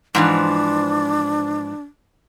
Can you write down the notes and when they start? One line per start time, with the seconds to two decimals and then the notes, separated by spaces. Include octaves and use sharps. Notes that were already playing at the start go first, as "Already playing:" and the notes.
0.15 G#2 E3 F3 D4